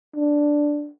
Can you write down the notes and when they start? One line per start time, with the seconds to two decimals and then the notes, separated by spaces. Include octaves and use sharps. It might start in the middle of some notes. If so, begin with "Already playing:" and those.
0.16 D4